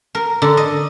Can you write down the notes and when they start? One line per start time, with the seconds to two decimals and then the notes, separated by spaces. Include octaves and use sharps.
0.15 A#4
0.42 D3
0.57 D#5